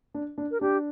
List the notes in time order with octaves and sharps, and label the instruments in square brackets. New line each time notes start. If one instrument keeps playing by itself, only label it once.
[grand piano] D4
D4
[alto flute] A#4
[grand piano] D4 [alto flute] G4